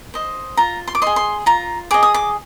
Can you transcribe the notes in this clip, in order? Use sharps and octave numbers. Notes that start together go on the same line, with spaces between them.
C5 D#5
F4 A#5
C6
D6
G#4 D#5 C6
C6
F4 A#5
G#4 D#5 D6
D#6
D6